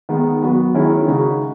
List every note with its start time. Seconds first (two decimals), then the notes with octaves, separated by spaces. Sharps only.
0.09 D#3 G#3 B3
0.42 F#3 B3 F#4
0.75 D#3 G#3 C#4 E4
1.08 C#3 G#3 D#4 F#4